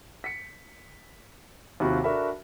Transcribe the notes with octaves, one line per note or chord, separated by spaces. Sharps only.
B6 C#7
D#2 C3 F4 F#4 B5
D4 F#4 A4 A#4 E5 B5